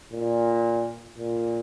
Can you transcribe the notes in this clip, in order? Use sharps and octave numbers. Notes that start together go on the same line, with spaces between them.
A#2
A#2